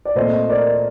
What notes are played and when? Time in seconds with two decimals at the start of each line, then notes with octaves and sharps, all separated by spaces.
0.05 D5
0.15 A#2 A3 C4 C5 D#5
0.49 A#4 D5